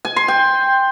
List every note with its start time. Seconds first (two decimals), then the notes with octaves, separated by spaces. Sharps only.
0.05 G#5
0.16 C6
0.28 G5